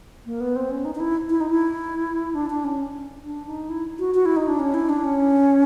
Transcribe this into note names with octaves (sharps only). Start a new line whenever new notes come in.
A#3
B3
C4
C#4
D#4
D#4
E4
E4
D#4
E4
D4
D4
C#4
D4
D#4
E4
F#4
F#4
E4
D#4
D4
C#4
E4
D4
C#4